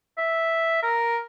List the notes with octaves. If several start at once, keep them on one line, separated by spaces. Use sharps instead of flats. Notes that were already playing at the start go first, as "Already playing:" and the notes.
E5
A#4